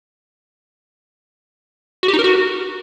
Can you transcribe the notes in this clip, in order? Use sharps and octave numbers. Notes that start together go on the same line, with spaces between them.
F#4
G4
D#4
A#4
F#4